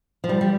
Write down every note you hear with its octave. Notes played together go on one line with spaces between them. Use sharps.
F3
G3
G3